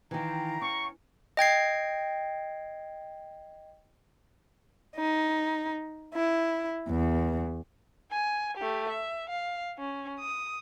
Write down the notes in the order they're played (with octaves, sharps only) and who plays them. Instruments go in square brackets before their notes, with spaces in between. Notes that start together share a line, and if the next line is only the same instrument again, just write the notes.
[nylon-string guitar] D#3 E3 [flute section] F5 G5 A#5
[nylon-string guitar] C#4 [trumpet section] C#6
[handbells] D#5 G5 G#6 C7
[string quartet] D#4
E4
E2
[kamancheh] G#5
A3 G4
E5
F5
C#4
D#6